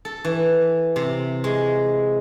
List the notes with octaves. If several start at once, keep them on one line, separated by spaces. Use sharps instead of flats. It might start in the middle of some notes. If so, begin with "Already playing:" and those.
A4
E3
C3
G#3